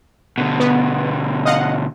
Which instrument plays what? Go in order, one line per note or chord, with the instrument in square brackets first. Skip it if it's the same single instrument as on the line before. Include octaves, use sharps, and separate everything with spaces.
[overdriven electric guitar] B2 D3
[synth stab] B3
D#5 F5 F#5